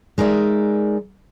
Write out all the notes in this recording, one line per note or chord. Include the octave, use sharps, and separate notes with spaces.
G#3 D#4 A#4 D5 E5